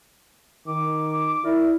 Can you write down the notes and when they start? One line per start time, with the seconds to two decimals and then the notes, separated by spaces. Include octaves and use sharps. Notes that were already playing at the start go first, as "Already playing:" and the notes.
0.67 D#3 D6
1.44 E4 A#4 D5